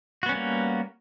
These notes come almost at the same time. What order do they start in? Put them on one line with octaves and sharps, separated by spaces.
F#4 B3 C#4 G3 A#3